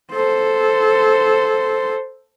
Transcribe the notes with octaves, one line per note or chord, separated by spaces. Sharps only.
A4 C5